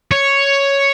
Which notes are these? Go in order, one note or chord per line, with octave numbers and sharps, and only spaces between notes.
C#5